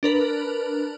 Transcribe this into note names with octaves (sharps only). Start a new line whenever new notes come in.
D4 A#4 B4